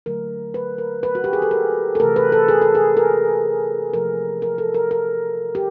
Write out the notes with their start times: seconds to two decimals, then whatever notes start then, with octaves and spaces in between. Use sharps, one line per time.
0.06 D3 F#3 A3 A#4
0.54 B4
0.78 A#4
1.03 B4
1.15 F#4
1.24 G4
1.33 G#4
1.42 A4
1.51 A#4
1.95 A4
2.00 C3 E3 A3 A#4
2.16 B4
2.32 A4
2.48 G#4
2.62 A4
2.75 G#4
2.97 A#4
3.93 C3 F3 A3 A#4
4.42 A#4
4.58 A4
4.74 A#4
4.91 A#4
5.55 G4